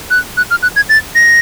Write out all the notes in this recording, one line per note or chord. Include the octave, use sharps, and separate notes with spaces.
F#6
F#6
F6
F#6
G#6
A6
A#6